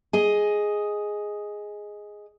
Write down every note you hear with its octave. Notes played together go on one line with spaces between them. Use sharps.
G#4 D#5